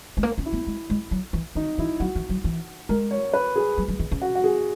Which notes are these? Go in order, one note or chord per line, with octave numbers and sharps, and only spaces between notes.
G#3
A#3
C#4
E4
B3
G#3
G#3
F#3
E3
D#3 D#4
E3 E4
F#3 F#4
E3
F#3
E3
G#3 A#4
C#5
B4
G#4
F#3
F#3
D#3
C#3
F#4
F#4
G#4